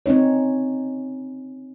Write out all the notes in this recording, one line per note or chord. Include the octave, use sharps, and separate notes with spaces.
C4 C#4 D#4 C#5